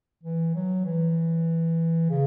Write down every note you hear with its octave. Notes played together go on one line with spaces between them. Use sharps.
E3
F#3
E3
C#3